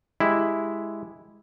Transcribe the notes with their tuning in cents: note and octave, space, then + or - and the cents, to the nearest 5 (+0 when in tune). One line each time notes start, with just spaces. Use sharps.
G#3 +0 E4 +0 G4 +0